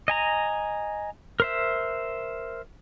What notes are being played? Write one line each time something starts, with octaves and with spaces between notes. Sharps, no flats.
D#5 G#5 A#5
A#4 C5 E5